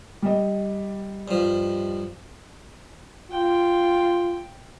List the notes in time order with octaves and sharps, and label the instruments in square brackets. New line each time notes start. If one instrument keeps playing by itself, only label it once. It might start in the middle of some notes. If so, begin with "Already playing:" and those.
[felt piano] G3 D#5
[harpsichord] G2 F3
[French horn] F4 [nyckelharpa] G5